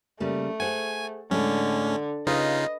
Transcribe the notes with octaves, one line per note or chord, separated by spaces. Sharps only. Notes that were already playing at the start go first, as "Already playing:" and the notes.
C#3 G3 A3 A#3
G#4 C5 F#5 G#5
A2 D3 G#3 A3 C#4
C#3 D#4 F4 B4 D#5